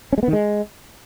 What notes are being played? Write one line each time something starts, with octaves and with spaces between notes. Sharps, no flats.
C#4
G#3
B3
D#3
G#3